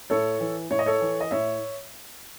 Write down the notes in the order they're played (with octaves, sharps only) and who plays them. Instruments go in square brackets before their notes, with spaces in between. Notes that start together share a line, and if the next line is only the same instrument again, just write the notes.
[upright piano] A2 A4 C#5
E3
A2 C#5
D#5
A4 C#5
E3
D#5
A2 C#5 E5